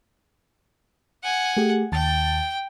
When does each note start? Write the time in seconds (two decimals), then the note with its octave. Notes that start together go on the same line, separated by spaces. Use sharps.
1.23 F#5 G#5
1.57 A3 G4 G#4
1.92 D#2 G5 A5 A6